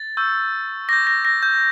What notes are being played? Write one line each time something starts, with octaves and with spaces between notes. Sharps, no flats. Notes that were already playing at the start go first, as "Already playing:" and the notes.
Already playing: A6
C#6 E6 G6
D6 G6 A#6
A#6
A#6
G6